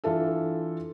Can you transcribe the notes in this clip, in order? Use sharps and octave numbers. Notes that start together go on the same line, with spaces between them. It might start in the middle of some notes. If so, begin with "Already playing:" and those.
E3 D4 F4 A4 E5